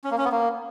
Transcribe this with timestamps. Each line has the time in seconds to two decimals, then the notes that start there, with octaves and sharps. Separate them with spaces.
0.04 C#4
0.11 A#3
0.18 C#4
0.25 B3
0.32 A#3